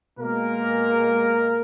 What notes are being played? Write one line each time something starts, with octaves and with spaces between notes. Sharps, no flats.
B2 G#3 A#3 A#4